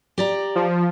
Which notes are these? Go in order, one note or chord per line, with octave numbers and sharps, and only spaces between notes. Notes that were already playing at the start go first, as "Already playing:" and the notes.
G4 D5 A#5
F3